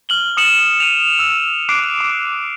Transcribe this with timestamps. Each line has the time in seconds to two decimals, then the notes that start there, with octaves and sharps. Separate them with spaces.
0.09 F6 F#7 G7
0.37 D#6 C#7 E7 F#7
0.80 D#7 F7
1.19 E6
1.69 D6 F#6 C7 D7
2.01 D6